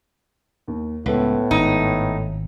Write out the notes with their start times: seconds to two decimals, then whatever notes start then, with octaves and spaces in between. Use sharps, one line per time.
0.68 D#2
1.06 C#2 A2 B3 A4
1.51 G#1 D#4